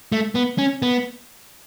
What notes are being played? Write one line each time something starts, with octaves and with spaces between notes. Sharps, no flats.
A3
B3
C#4
B3